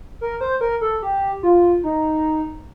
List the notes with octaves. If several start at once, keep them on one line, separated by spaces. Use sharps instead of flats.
A#4
C5
A#4
A4
G4
F4
D#4